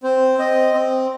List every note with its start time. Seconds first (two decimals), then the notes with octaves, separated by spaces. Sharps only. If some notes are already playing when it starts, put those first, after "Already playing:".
0.03 C4 C5
0.39 C4 D#5
0.74 C4